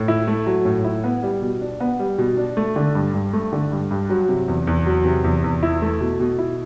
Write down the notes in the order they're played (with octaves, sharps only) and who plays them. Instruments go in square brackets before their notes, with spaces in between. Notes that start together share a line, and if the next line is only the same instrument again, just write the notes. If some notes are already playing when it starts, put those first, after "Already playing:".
Already playing: [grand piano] A2
E4
A3
F#3
A2
E4
B3
G3
B2
D4
B3
G3
B2
D4
A3
D3
G2
G2
A3
D3
G2
G2
F#3
C3
E2
E2
F#3
C3
E2
E2
E4
A3
B2
B2
E4